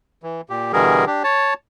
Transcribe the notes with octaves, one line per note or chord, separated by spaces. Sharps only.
E3
A#2 G4
B2 D3 E3 G3 G#4 A#4
D4 G4
C#5 A5